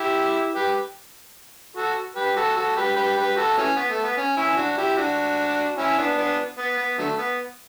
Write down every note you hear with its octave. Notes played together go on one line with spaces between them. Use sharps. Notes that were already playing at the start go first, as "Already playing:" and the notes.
Already playing: E4 G4
G4 B4
F#4 A4
G4 B4
F#4 A4
F#4 A4
G4 B4
G4 B4
G4 B4
F#4 A4
E3 A3 C#4
B3
A3
B3
C#4
C#4 E4
D4 F#4
E4 G4
D4 F#4
C#4 E4
B3 D4
B3 D4
B3
B3
D3 F#3 A3
B3